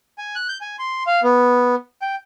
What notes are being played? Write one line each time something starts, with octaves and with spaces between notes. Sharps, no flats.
G#5
F#6
G6
G#5
C6
F5
B3
G5